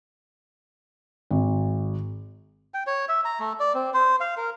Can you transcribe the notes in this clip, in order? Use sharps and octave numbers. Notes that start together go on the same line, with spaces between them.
G#1
G5
C#5
E5
A#5
A3
D5
C4
C5
F5
A#4